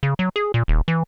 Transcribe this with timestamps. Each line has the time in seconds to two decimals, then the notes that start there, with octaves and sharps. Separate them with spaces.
0.03 C#3
0.19 F#3
0.36 G#4
0.54 A#2
0.68 D#1
0.88 E3